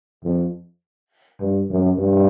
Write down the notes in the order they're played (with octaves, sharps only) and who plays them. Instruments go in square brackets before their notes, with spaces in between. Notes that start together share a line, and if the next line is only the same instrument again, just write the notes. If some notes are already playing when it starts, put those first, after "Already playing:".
[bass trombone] F2
G2
F#2
G2